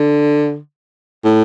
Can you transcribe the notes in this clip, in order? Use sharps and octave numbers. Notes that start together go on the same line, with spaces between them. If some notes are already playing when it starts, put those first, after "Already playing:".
Already playing: D3
A2